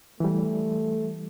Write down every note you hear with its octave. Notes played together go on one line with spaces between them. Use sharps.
E3 G3 A3